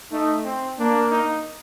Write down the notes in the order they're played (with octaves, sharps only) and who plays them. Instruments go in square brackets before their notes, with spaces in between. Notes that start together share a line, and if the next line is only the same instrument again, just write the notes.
[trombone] A3 [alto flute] D#4
[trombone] C4
[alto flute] A#3 [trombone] D4
[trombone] D#4